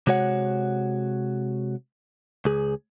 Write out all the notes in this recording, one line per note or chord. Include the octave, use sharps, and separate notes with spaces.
C3 G#3 F#4 C#5 F#5
C#2 G#4